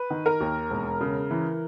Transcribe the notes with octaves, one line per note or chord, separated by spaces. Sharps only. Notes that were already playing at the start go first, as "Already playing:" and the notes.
Already playing: B4
D#3
A#4
D#2
E1
C#3
E3